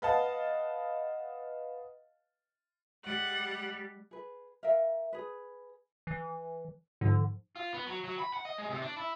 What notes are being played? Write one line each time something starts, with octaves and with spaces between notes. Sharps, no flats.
B4 D#5 F5 F#5 A5
G3 G#3 F#5
G#4 B4
A#4 E5 F5
G#4 B4
E3
G#2 D3 F3
F4
B3
F#3
F#3
B5
F#5
D#5
G#3
C3
D4
E4